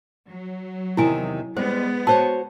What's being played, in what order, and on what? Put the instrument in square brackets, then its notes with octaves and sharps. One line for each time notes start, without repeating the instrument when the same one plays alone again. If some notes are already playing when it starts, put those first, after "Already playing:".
[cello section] F#3
[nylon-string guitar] E2 C3 D#3 [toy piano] E4 G#5
[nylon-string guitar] G3 [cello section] G#3 B3 [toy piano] C5
[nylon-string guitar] F#4 C5 C#5 [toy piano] A5